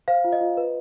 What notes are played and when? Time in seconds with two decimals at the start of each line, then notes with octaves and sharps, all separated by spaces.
0.08 C5 F5
0.24 F4
0.33 D#5
0.41 F4
0.57 B4